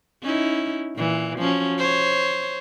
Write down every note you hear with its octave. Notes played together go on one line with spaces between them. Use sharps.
C#4 D#4 E4
A#2 E3
F3 C#4 F#4
C5 C#5